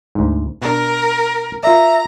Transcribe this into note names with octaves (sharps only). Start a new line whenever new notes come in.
D2 G#2
B2 D4 A#4
F4 A#4 D5 E5 A#5